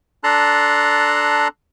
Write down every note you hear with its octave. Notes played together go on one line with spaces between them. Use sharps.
D4 A4 A5 A#5 C6 F#6